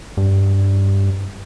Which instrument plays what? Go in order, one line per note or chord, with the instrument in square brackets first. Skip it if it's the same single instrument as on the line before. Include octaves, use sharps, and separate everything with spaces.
[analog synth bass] G2